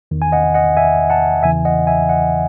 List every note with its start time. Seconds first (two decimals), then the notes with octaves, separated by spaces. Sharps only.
0.11 E2 D#3
0.22 G#5
0.32 D#5 F#5
0.54 D#5 F#5
0.77 E5 G#5
1.10 F#5 A5
1.43 E2 C#3 E3 E5 G#5
1.65 D#5 F#5
1.87 E5 G#5
2.09 D#5 F#5